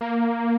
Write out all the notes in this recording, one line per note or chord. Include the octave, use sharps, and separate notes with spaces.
A#3